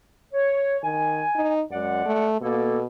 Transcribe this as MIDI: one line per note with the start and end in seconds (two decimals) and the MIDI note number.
0.33 0.77 73
0.83 1.23 51
0.83 1.50 80
1.35 1.62 63
1.71 2.06 42
1.71 2.27 56
1.71 2.27 74
1.71 2.27 78
2.06 2.37 57
2.41 2.86 47
2.41 2.78 58
2.41 2.78 69